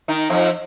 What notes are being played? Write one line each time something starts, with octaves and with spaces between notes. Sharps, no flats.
D#3 D#4
F2 F3